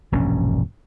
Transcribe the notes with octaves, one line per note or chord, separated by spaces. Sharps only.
E1 A#1 G2 C#4